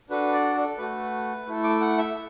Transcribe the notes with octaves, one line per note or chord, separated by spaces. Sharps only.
D4 F#4 A4 B4
D5
A4
A3 F#4 A4 B4
A3 E4 A4
D6
F#5
E5